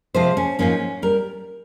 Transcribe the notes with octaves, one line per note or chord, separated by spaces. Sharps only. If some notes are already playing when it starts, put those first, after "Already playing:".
C3 F3 G#3 C5
C#4
G#2 F3 A#3 C#4
G3 A#4